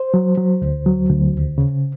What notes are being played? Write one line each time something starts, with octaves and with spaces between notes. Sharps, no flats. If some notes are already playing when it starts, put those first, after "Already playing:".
Already playing: C5
F#3
F#3
D2
F#3
D2
D#2
C#3